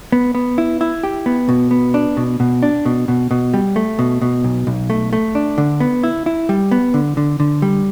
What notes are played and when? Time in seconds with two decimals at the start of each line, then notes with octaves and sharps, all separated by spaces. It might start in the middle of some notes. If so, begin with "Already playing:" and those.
0.12 B3
0.35 B3
0.58 E4
0.81 E4
1.04 G4
1.26 B3
1.49 B2
1.71 B3
1.94 D4
2.17 B2
2.40 B2
2.63 D4
2.86 B2
3.08 B2
3.31 B2
3.54 G3
3.76 A3
3.99 B2
4.22 B2
4.44 B1
4.67 B1
4.90 A3
5.13 A3
5.35 D4
5.58 D3
5.80 B3
6.03 E4
6.26 E4
6.49 G3
6.72 B3
6.94 D3
7.17 D3
7.40 D3
7.62 G3